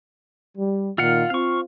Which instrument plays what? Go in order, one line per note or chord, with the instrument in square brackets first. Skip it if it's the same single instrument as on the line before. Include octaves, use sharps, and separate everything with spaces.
[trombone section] G3
[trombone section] A#2 D#3 [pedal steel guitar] F4 F5 F#5
[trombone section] C4 F4 [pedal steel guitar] F5 C#6